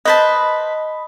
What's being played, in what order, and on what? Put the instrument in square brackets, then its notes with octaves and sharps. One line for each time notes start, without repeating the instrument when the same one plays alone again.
[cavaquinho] B4 C5 A5 [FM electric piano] D#5 B5